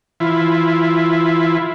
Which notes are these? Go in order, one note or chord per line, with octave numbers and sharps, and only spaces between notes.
E3 E4 F4